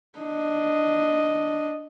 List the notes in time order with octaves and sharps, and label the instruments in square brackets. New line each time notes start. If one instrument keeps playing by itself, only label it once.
[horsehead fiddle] D4 D#5